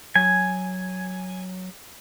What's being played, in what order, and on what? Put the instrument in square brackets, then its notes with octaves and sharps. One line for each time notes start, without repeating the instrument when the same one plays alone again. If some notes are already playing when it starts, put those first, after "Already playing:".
[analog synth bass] F#3 [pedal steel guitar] G#5